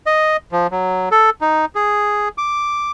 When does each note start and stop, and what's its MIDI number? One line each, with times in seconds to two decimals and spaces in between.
0.06 0.37 75
0.52 0.67 53
0.71 1.09 54
1.12 1.30 69
1.41 1.65 63
1.75 2.29 68
2.38 2.92 86